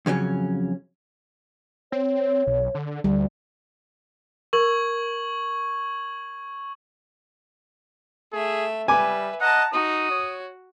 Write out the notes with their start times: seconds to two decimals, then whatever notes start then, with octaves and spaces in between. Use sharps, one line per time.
0.06 F2 C#3 F#3 C#4
1.92 C4 C#5
2.47 B1
2.75 D3
3.04 D2 G3
4.53 A#4 C#6 G#6 F#7
8.33 A3 G#4 E5
8.88 G3 B4 E5 G#5 D6
9.41 D#5 F#5 A5 A#5
9.74 D#4 F#4 D#6
10.11 C#5